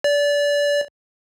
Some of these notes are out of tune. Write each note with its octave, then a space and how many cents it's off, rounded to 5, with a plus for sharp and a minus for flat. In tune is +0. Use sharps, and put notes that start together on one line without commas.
D5 -25